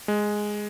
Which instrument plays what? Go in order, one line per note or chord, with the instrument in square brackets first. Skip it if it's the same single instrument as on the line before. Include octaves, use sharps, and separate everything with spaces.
[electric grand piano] G#3